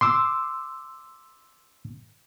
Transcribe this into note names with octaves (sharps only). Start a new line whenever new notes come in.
C6 D6 E6